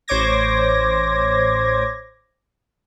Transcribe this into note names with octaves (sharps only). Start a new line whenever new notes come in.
A1 C5 C#5 D6 G#6 A#6